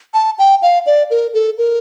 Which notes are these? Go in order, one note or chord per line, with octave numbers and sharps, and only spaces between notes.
A5
G5
F5
D5
A#4
A4
A#4